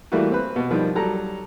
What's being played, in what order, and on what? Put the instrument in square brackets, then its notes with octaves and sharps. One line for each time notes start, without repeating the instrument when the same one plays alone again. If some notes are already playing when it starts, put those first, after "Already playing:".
[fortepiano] E3 G3 A3 A#3 F#4
C4 B4
B2
D#3 F3 G3
F#3 G3 A4 A#5